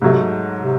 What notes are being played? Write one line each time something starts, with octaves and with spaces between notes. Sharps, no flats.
G#2 C3 F#3 A3
C3